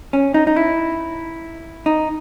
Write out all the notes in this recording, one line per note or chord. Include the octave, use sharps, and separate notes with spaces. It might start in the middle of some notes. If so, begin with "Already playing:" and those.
C#4
D#4
D#4
E4
D#4